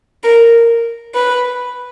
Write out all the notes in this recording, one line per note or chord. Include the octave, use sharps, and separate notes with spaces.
A#4
B4